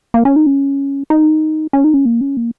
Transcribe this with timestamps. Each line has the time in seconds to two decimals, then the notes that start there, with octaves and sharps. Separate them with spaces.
0.14 A#3
0.25 C#4
0.36 D#4
0.46 C#4
1.10 D#4
1.73 C#4
1.84 D#4
1.94 C#4
2.05 A#3
2.21 C#4
2.37 A#3